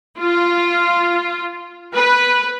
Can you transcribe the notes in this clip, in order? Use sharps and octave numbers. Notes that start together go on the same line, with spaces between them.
F4
B4